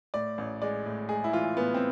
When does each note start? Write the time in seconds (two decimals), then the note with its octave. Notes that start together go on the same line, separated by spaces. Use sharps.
0.14 A2 D5
0.38 A1
0.62 G#3 D5
0.86 A2
1.09 G#3 G#4
1.24 E4
1.33 E3 F4
1.56 A2 B3
1.74 C4